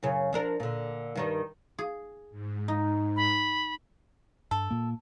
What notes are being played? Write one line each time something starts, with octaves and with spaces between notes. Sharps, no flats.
F#2 C#3
F3 D4 A#4
A#2 D3
G2 D#3 G3
G#4
G#2
D#4
B5
G2 A4
A#2 A#3